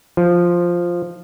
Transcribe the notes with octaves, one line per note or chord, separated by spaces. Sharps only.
F3